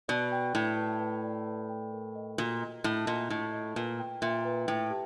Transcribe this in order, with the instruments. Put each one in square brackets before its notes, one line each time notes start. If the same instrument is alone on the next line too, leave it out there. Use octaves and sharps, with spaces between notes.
[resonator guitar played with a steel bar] B2 [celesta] D5
[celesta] G5
[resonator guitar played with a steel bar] A2 [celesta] B4
[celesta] B4
B4
D5
B4
G5
A#4
D#5
[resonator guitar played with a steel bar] A#2 [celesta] F#4
[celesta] D#5
[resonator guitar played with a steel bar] A2 [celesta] D#5
[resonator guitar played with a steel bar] A#2 [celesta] D#5
[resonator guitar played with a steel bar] A2 [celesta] D#5
[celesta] D#5
[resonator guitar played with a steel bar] A#2 [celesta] B4
[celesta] G5
[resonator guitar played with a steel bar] A#2 [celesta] E5
[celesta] B4
[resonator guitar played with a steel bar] A2 [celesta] G5
[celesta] G4